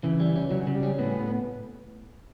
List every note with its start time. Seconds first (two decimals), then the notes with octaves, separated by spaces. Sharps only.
0.03 C#3 E3
0.20 G3
0.36 C#4
0.51 C#3 F#3
0.67 C#3
0.75 G3
0.83 C#4
0.98 A2 B3